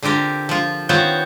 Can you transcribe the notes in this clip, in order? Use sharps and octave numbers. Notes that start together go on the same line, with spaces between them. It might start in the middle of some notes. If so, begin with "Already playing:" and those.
D3 C4 F4 G4 A#4
F3 F4
D#3 B3 C4 F4 C5 C#5